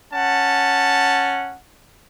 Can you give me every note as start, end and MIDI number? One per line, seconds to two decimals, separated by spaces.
0.13 1.56 61
0.13 1.56 78
0.13 1.56 81